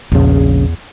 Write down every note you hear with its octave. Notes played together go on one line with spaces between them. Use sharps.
A#1 E2 C#3